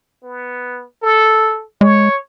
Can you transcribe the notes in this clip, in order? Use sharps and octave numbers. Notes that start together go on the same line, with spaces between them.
B3
A4
G#3 C#5